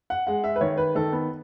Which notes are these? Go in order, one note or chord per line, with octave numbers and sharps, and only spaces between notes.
F#5
G#3 F#5
E5
B4
D#3 C#5
B4
D#3 A4
B3